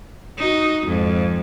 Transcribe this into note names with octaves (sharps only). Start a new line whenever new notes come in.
D#4 F#4
F2 G#2